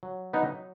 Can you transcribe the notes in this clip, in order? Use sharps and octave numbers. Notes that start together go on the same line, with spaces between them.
F#3
B3 D#4